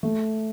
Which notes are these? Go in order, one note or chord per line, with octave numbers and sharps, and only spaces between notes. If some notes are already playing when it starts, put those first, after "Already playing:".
A3